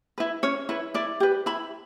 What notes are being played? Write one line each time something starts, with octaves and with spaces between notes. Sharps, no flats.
E4 B4
C#4 C#5
E4 B4
E4 D5
G4 B4
E4 B5